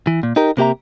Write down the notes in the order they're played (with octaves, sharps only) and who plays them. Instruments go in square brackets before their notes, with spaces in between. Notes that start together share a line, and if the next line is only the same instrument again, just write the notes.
[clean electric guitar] E3
A#2
D#4 G4 A#4
C3 A#3 G4 E5 A#5